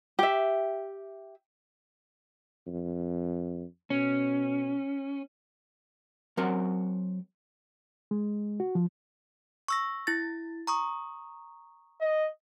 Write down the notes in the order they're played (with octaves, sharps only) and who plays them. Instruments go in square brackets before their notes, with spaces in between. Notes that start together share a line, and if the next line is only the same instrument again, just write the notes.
[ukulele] G4 E5
[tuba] F2
[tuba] B2 [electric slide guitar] C#4
[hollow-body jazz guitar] F#3 C4 A#4 F#5
[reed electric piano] G#3
F#4
F3
[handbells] C#6 E6 A#6
E4 A6
A#5 C#6 D#6
[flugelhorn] D#5